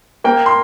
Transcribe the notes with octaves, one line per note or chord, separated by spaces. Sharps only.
A#3 G5
C6